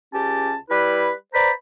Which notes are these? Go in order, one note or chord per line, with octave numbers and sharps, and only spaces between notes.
C#2 C#4 G4 A5
G3 E4 B4
B4 C5 D5 A#5 B5